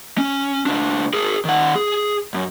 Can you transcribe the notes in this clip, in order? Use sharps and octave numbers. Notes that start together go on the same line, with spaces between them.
C#4
C#2 D4
G#4 A#4
D#3 F#5
G#4
F#2